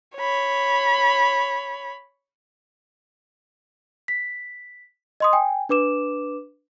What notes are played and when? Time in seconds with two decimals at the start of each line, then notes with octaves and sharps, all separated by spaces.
0.16 C#5 B5
4.08 B6
5.20 D#5 C6 D#6
5.33 G5 G#5
5.69 D4 B4 D6 E7